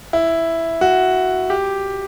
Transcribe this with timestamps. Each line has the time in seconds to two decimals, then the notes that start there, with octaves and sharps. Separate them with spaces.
0.13 E4
0.81 F#4
1.50 G4